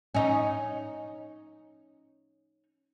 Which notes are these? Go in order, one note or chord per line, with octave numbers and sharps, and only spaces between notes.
C#4 D#4